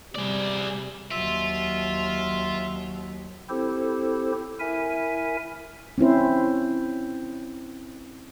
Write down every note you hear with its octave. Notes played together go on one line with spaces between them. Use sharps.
C3 G3 G#4 D5
D#2 F#3 F4 E5
C4 E4 G4 A4 C5
E4 A#4 E5 G#5
C4 C#4 E4 C5